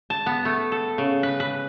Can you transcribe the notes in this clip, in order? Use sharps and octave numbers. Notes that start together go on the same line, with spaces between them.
A5
B3
A3
A4
C#3
B4
B4